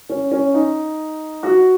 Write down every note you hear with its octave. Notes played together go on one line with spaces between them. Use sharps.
C#4
C#4
D#4
F#4